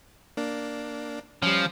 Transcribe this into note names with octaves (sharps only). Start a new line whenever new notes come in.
A#3 D4
F3 G3 C#4